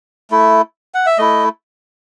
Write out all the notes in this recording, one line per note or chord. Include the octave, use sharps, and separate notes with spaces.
A3 E4
F#5
E5
A3 E4 D#5